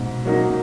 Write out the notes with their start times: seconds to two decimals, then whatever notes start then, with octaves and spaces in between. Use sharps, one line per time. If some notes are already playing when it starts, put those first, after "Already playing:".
Already playing: G#2 B2
0.25 F#3 A#3 D#4